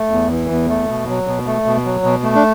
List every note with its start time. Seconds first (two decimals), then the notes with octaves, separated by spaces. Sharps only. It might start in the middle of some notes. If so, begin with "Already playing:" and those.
Already playing: A3
0.11 E2
0.30 E3
0.50 E2
0.69 A3
0.89 B2
1.08 F#3
1.27 B2
1.47 A3
1.66 B2
1.85 F#3
2.04 B2
2.23 A3
2.35 D4